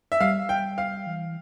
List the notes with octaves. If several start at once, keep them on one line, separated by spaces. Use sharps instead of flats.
E5
G3 F5
G5
F5
E3